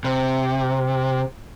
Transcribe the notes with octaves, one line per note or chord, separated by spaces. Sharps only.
C3